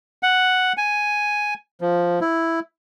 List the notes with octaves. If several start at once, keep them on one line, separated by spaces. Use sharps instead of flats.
F#5
G#5
F3
E4